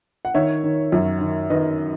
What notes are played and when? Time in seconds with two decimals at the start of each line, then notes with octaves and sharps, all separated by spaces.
0.25 F#5
0.34 D#3 C#5 E5
0.64 D#3
0.92 F#2
1.21 D#3
1.50 D#3 B4 D#5